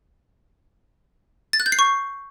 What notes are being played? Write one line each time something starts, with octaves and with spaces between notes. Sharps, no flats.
A6
F#6
G6
C7
C#6